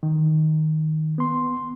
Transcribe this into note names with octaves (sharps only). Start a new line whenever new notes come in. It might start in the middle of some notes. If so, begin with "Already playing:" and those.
D#3
B3 C6